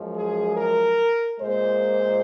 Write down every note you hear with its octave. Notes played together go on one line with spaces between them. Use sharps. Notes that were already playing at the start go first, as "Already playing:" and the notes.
Already playing: F#2 F3 G#3
G#4
A#4
A#2 G#3 C5